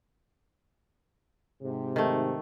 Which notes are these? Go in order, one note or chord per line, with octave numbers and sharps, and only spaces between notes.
G#2 C3
D#3 A3